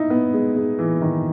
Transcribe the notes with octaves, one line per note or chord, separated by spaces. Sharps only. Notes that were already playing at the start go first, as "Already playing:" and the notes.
Already playing: D#4 E4
B3
G#3
G#3
E3
D#3